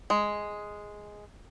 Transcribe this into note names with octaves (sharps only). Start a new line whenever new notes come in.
G#3